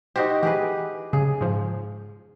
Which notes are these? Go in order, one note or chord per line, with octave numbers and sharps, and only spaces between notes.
D#4 F#4 G4 C5
E3 G4 G#4 B4
C#3 G#4
G#2 F3